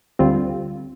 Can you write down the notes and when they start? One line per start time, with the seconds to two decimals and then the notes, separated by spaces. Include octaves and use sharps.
0.19 D2 D3 G3 C4 F4